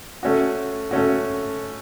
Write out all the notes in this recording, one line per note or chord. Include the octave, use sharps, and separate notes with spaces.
A3 C#4 F#4
A3 C#4 F#4